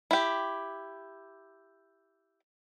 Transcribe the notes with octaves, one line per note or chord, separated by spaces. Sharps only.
E4 G4